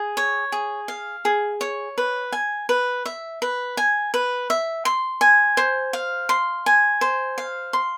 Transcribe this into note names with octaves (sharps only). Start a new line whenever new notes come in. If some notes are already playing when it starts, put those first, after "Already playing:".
Already playing: G#4
C#5
G#4
F5
G#4
C#5
B4
G#5
B4
E5
B4
G#5
B4
E5
C6
G#5
C5
F5
C6
G#5
C5
F5
C6